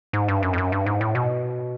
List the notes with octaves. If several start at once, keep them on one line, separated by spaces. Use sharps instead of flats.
G#2
G2
F#2
F2
F#2
G2
G#2
A2
B2